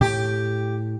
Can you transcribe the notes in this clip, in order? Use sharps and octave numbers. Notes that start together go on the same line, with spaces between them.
A2 G4